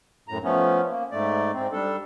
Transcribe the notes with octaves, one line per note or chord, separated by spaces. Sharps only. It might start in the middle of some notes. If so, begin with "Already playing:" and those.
F#2 A2 A#5
F3 A3 B3 C#4
A#3
G#2 A3 D5
G#2 C4
G3 D4 A4